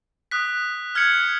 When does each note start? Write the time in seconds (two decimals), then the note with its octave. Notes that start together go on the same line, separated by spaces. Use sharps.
0.31 D#6 F#6 B6
0.95 F6 G#6 C#7 F#7